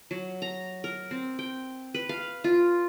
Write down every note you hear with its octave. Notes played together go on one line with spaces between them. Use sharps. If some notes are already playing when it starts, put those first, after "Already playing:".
F#3
A#5
A#4
C4
G5
B4
F5
F4